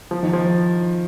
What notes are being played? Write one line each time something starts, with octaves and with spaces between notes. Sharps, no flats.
F3
D#3
F3